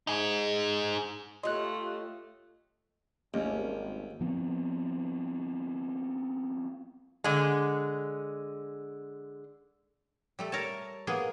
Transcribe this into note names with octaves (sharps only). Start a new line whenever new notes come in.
D#4 G#4
A3 F4 G4 C#5 D#5 C6 F#6
G#1 D#2 G3 A3 C#4
F3 B3 C4
D3 G#3
G3 A3 A4
A#4 C#5 A5
A#3 B3 G#4